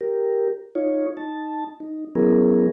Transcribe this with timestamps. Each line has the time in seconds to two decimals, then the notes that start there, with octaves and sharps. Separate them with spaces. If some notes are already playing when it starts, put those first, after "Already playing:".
0.01 G4 A#4
0.75 D#4 F4 C#5
1.17 D#4 A5
1.80 D#4
2.15 F#3 B3 C#4 E4 G#4 A#4